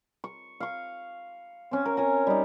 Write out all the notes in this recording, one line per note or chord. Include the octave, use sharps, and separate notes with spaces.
C#6
F5 C#6
C4 C#4
A#4
C#5 G#5 A#5
G3 D#4